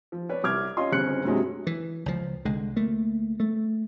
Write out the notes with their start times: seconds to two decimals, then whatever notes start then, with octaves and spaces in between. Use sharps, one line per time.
0.12 F3
0.29 B4 C#5 D5
0.44 C2 D6 F6 G#6
0.77 C#4 F4 D#5 C6
0.92 G1 C#3 C4 F#6 C#7
1.25 G2 C3 F#3 G#3
1.67 E3
2.06 C#2 F3
2.45 C2 D3 G#3
2.76 D2 A3 A#3
3.40 A3